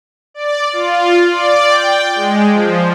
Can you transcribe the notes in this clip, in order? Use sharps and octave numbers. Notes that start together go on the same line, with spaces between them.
D5
F4
D5
G5
G#3
F3